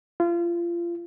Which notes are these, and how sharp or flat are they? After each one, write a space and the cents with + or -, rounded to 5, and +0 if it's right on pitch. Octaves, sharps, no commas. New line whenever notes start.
F4 -30